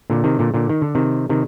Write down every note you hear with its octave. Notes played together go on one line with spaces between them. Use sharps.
A#2 D3
C3 D#3
A#2 D3
A#2 D3
D#3
D3
C3 D#3
C3 D#3